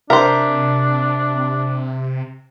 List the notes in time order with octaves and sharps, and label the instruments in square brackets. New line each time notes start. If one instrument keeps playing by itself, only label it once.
[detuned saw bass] C3 [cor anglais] D4 [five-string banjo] A#4 C5 [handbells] E5